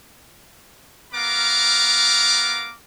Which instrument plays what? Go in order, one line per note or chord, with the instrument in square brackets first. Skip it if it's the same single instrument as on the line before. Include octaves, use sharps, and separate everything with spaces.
[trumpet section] B3 A#4 F5 A#5 D6